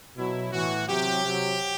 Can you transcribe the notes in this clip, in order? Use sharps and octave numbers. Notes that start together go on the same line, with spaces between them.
B2 F#3 E4
A2 E3 F#4
C3 F#3 G4
C3 F#3